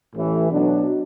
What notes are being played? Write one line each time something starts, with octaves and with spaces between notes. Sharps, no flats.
A1 A2 E3
B2 F#3 D4